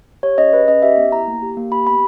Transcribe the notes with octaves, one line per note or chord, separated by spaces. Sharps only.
G4 C#5
C#4 D#5
G#4 B4
C#4 D#5
G4 E5
B3
E4 A#5
A#3
G4
A#3
G4 B5
B3 B5